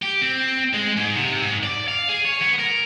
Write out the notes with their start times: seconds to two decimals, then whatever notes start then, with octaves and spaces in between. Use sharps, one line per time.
0.03 G4
0.22 C4
0.73 G#3
0.97 G#2
1.15 C3
1.41 G#2
1.63 D5
1.88 F5
2.09 G#4
2.25 C#5
2.42 B3
2.59 A#4